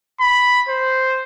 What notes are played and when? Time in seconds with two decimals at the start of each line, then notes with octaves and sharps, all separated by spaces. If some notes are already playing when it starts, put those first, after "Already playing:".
0.21 B5
0.69 C5